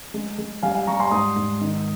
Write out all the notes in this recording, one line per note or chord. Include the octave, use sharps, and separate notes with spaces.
G#3
G#3
G3 F5 G#5
F5 G#5
G3 A#5 C#6
G#5 C6
G#2 C6 D#6
G#2
D#3